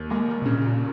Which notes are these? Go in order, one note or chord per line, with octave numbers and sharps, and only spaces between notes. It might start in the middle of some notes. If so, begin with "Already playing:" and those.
Already playing: D#2
G#3 A#3
G3
C3
A#2 C#3